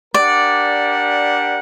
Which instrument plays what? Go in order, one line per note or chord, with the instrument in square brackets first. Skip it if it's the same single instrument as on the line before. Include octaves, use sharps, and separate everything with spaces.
[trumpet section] D4 G4 A#4 F#5 [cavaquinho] D5